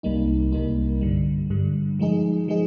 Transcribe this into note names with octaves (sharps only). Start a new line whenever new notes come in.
C2 C3 G3 A#3 D#4
C2 C3 G3 A#3 D#4
G2 D3 G3
G2 D3 G3
F3 G#3 D#4 G#4
F3 G#3 D#4 G#4